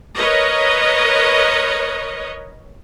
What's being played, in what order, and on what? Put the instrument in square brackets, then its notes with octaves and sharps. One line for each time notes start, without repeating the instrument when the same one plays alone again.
[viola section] A#4 B4 C#5 D#5